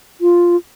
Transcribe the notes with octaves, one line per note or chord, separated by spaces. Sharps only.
F4